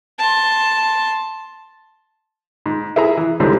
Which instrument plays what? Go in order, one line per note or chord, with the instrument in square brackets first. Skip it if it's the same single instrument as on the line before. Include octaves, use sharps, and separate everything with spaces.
[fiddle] A5 C6
[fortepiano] G#2
E4 G#4 A#5
E3
C#2 G#2 D3 E3 G3 C4